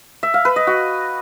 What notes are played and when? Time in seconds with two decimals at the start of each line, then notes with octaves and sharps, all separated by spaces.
0.23 E5
0.34 F5
0.45 B4
0.56 D#5
0.67 F#4